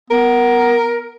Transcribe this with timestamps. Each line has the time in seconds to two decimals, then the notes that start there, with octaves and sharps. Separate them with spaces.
0.11 B3 A#4